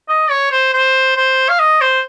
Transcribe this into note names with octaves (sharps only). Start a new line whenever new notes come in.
D#5
C#5
C5
C5
C5
F5
D#5
C5